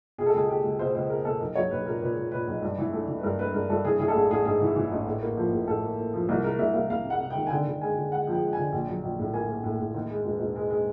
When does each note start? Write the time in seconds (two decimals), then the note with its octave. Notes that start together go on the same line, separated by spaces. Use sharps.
0.18 B2 G#4
0.26 A4
0.34 C#2 G#4
0.49 G#3 G4
0.64 C#2
0.79 B2 C5
0.95 C#2 C5
1.09 G#3 A#4
1.25 B2 A4
1.40 B1 A#4
1.55 F#3 C#5
1.71 B1 B4
1.86 A#2 A#4
2.02 A#2 B4
2.17 A#2
2.32 A#2 B4
2.47 B1
2.62 G2
2.78 E3
2.93 A3
3.08 E3
3.18 B4
3.23 G2 A#4
3.39 A3 B4
3.54 G2 A#4
3.70 G2 A4
3.85 E3 G#4
3.99 E3 G#4
4.08 A4
4.15 A1 G#4
4.30 A1 G#4
4.45 G#2 G#4
4.61 E3
4.76 E3
4.92 A1
5.07 A2
5.22 A#3
5.37 F3
5.53 A2
5.68 A2 A4
5.83 A#3
5.98 A#3
6.14 F3
6.28 C2 A#4
6.44 C3 A#4
6.59 C2 E5
6.74 C2 F5
6.90 C2 F5
7.05 C3
7.10 F#5
7.21 C3
7.30 G5
7.35 D#3
7.47 G#5
7.50 D3 G5
7.66 D3
7.81 G#3 G#5
7.96 D3
8.11 G#3 F#5
8.27 F3 G5
8.42 G#3
8.53 D3 G#5
8.72 A#1
8.88 F#3
9.03 A#1
9.19 A2
9.33 A#3 G#5
9.49 A#3
9.64 A2
9.80 A2
9.95 D#2
10.10 G#3
10.25 E1
10.40 E1
10.56 G#3
10.70 G#3